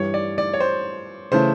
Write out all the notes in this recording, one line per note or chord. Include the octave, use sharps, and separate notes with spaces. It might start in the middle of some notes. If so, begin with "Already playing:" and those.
Already playing: G2 E3 G3 C#5
D5
D5
C#5
C5
C#3 E3 A3 C5